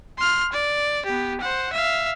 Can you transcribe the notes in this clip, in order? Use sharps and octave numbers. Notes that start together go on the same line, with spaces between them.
C6 F6
D5
B3 G4
C5 F#5
E5 F5